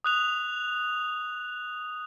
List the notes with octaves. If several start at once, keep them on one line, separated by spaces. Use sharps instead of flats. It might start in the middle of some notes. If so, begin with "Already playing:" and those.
D#6 F#6 F7